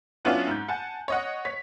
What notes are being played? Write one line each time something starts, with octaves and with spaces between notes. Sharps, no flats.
F#3 B3 C#4 D4 E4 F4
G#2 G6
F#5 G#5 A5
C#5 D#5 F#5
C#5 B6